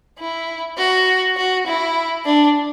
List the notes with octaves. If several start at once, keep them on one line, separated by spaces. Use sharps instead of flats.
E4
F#4
F#4
E4
D4